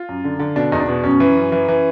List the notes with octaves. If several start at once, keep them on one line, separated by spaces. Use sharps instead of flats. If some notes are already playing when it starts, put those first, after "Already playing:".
Already playing: F4
F#2
D3
D3
B2 D4
E2 D#4
D4
B2
F#2 C#4
E3
F#2
E3
E3